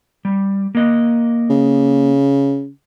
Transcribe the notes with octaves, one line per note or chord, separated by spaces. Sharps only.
G3
A#3 D#5
C#3